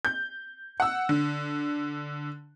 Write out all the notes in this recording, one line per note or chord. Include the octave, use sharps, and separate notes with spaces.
G6
F#5 E6
D3